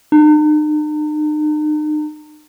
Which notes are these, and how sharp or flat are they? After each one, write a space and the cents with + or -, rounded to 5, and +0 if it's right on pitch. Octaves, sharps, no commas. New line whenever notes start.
D#4 -45